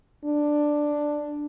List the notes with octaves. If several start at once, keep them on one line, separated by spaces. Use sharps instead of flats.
D4